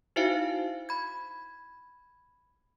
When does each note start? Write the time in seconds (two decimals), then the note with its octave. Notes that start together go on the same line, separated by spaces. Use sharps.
0.16 D#4 E4 F#4 C5 E5 F5
0.89 B5 G#6